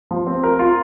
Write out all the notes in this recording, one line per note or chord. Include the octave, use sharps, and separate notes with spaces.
F3
C4
A#4
F4